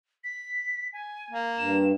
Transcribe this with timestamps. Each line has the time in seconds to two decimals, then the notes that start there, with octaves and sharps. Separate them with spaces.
0.24 B6
0.93 G#5
1.31 A#3
1.58 G2 E7